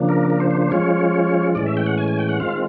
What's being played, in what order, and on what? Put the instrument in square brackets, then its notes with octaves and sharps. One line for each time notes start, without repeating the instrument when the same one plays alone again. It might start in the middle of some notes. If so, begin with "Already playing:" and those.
Already playing: [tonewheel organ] C#3 F3 A#3 D4
A#4
A#4
C5
C5
C5
F3 G#3 C#4 F4 C#5
A2 E3 G#3 C#4 D5
E5
G5
F#5
G#5
G#5
G5
F#5
D#3 G#3 C4 F4 F5